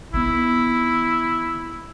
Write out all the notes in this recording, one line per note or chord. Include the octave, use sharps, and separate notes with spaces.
D#3 B3 E4